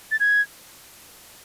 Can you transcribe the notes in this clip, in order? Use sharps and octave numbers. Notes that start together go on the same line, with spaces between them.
A6
G#6